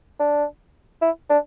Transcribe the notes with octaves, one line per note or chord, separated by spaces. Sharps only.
D4
E4
D4